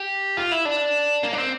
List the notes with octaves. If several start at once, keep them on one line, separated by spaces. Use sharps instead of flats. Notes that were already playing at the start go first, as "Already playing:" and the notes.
Already playing: G4
F4
E4
D4
A#3
D4
C4